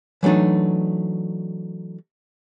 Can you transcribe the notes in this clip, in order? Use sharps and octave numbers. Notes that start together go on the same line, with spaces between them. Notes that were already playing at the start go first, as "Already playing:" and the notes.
E3 F#3 A3 D4 D#4